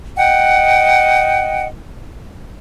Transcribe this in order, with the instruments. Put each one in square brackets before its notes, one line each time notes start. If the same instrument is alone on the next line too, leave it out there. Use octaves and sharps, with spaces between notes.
[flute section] D#5 F#5 G5